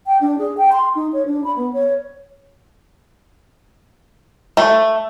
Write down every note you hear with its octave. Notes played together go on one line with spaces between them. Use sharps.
G5
D4
G#4
G5
C6
D#4
C#5
D4
B5
B3
C#5
A3